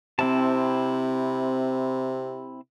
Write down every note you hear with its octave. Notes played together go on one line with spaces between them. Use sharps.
C3 C4 E4 A5